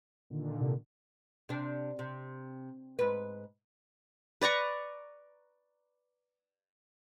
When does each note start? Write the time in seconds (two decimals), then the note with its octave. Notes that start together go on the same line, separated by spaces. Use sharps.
0.30 A#2 D3 D#3
0.61 C3
1.49 C3 D4
1.99 C3
2.99 G#2 B4
4.41 B4 D5 A#5 C#6